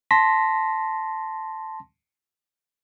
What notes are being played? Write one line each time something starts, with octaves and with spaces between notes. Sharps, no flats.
A5 C6 A#6 B6